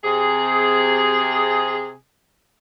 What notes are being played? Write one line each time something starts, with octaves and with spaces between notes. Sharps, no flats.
C3 G#4